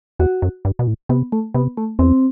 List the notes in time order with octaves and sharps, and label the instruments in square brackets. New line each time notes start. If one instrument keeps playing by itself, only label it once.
[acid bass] E2 [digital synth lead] F#4
[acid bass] F#2
G2
B2
A2
[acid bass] C3 [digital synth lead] B3
[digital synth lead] A3
[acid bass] C3 [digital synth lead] B3
[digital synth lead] A3
[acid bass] E2 [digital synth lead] C4